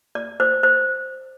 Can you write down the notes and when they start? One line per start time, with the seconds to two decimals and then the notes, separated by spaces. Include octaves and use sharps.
0.15 D5
0.40 C5
0.63 C5